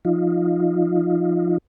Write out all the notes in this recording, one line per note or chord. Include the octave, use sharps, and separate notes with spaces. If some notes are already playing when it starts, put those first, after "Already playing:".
F3 D#4 F4